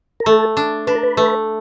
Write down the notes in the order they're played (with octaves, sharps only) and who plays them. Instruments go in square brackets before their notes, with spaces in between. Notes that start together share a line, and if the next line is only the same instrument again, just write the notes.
[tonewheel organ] A#4
[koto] A3 [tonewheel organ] A4
[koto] D4
[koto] D4 [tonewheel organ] B4
[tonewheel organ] A#4
B4
[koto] A3